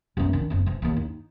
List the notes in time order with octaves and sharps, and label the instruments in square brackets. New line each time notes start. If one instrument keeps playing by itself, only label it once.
[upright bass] F#2 B3
D#3 D4
F#1 C4
E3 F3
D#2 A#3
D#4